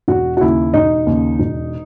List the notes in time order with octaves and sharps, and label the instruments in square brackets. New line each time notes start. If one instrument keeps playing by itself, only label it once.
[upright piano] E1 F#4
F#4
D#2 C#3 E4
E1 D#4
D#2 C#3
E1